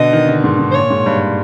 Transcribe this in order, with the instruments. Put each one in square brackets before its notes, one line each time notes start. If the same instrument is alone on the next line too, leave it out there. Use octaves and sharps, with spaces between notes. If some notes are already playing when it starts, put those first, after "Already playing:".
Already playing: [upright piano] B2 D3 [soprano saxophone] D#5
[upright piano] D#3
D3
G#2
G#2
[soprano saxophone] C5
[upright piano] A#2 [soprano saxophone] C#5
[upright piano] G#2
G2